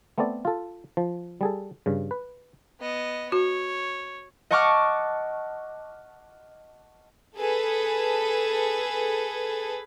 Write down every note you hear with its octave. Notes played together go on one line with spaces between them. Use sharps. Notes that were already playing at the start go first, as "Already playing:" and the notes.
A3 B3 C4 A4 D5
F4 A4
F3
G3 G#4 A4
G2 C#3
B4
B3 D#5
F#4 C#5
D#5 F#5 A5 C#6 D6 F6
G#4 A4 B4